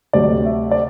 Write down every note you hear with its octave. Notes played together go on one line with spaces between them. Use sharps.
D2 C3 F#3 D5
E5
D5